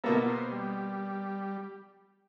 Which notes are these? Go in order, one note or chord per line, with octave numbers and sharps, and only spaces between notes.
B2 A#3 B3 A4 A#4 E5
C5
G3